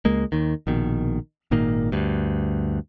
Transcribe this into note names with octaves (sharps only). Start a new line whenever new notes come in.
C#2 G#3 A#3
D#2 D#3
A#1 B2 D#3
G#1 A#2 D#3 A#3
D2 G2